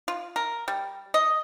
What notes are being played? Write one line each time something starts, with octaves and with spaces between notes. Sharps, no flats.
F4
A#4
G3
D#5